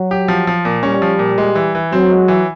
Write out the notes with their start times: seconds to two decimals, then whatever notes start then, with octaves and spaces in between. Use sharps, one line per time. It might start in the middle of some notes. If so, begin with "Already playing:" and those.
Already playing: F#3
0.11 G4
0.28 F3
0.47 F3
0.65 A#2
0.83 G3 C#4
1.02 F3
1.19 A#2
1.38 G#3
1.55 E3
1.75 E3
1.92 F#3 C4
2.11 G#3
2.28 E3